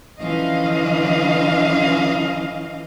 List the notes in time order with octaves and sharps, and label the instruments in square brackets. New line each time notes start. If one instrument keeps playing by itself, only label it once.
[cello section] D3 E3 F3 C#4 D#5 F5